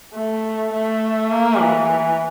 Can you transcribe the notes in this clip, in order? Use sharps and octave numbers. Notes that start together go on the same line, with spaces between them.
A3
A3
A#3
E3